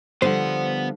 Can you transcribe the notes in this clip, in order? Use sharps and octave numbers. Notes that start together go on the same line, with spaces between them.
D3 F3 G3 B3 C5 F#5